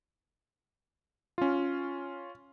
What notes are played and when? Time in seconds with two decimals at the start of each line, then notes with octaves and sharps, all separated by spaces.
1.38 C#4 F4